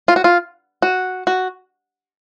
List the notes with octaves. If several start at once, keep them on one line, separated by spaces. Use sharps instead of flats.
F4
F#4
F4
F#4
F#4